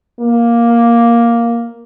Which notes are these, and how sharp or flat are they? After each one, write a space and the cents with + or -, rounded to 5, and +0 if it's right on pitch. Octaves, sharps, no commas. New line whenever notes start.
A#3 +5